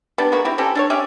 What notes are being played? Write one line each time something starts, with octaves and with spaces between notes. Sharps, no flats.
G3 B3 D4
G#3 A#3 B3 F#4
C4 E4 G4
C4 C#4 G4 A4
D4 A4 C#5
C#4 G4 D5 E5